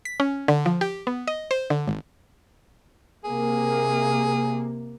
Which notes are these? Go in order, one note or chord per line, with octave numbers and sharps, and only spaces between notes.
B6
C#4
D3
F3
G4
B3
D#5
C5
D3
G#1
C3 A#3 G#4